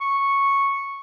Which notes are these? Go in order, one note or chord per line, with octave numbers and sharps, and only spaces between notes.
C#6